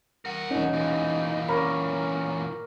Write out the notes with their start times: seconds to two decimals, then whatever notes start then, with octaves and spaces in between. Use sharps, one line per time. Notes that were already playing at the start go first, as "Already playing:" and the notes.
0.25 A#4 F#5
0.51 E1 C#4 D#4
0.73 A#2 E3
1.48 C#4 A#4 C#5 D5 B5